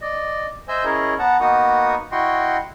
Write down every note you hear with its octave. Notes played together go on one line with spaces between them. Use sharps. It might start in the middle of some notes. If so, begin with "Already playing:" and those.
D5 D#5
C5 D#5 E5 G#5 E6 G6
C#4 E4 G#4 A#4 C#5 D#5
B3 F#5 A5 A#5
A#3 B3 D#4 F#4 C#6 D#6
E4 F#4 D#5 G5 C6 C#6